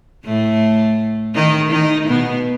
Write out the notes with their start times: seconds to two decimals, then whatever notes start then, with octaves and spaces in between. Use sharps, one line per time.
0.25 A2 A3
1.35 D#3 D#4
1.71 D#3 D#4
2.08 B2 B3